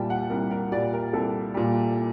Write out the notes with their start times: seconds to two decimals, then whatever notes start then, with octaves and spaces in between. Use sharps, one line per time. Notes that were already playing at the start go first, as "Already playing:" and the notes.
Already playing: C2 A#2 G3 G5 A5
0.10 F#5
0.30 C2 A#4
0.51 A#4
0.72 A#2 G3 D5
0.93 A#4
1.13 C2 A4
1.54 A#2 G3